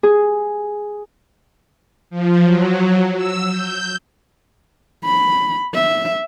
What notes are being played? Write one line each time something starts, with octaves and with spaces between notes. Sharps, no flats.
G#4
F3
F#3
E6
G6
B5
E5